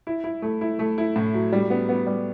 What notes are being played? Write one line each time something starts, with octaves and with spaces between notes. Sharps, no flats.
E4
E4
A3
E4
A3
E4
A2
F#3
G3
B3
B3
G3